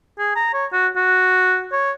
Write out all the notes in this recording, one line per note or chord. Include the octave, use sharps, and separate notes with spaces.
G#4
A#5
C#5
F#4
F#4
C#5